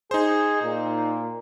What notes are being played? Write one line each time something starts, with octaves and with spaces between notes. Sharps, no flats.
D#4 G#4 C5
A#2